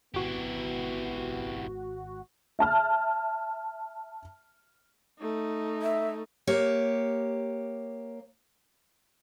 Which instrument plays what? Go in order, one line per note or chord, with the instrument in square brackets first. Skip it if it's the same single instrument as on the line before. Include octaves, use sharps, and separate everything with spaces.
[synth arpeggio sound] G#1 F#4 [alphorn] B3 [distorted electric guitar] E4 G4
[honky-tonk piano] E5 A5 F6
[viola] A3 D#4
[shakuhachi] E5
[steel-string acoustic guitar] A#3 G4 C#5